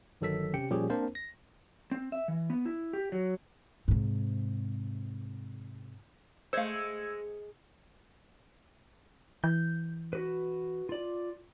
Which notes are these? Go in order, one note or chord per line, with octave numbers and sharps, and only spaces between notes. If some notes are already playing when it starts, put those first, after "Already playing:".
G1 D#3 F#3 A4 E6 B6
C3 C#4 G4 G5 C#7
A#2 F3 G3 C#4 G4 G#4
A#3 C4 D4 A#4 C5 A5
A#6
C4
E5
E3
B3
E4
G4
F#3
G#2 C3
G#3 A3 C5 F5 E6 G#6 C#7
E3 G6
F#4 B4
F4 D5